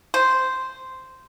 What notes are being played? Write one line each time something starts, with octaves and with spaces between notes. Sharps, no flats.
C5